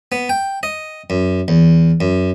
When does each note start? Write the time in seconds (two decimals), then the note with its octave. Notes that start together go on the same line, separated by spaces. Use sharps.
0.12 B3
0.29 G5
0.63 D#5
1.10 F#2
1.48 E2
2.01 F#2